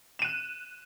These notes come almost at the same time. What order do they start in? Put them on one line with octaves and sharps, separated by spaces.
E7 D#7 F#6